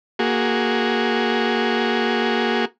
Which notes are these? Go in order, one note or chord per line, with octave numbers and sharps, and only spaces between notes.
A#3 F#4 G#4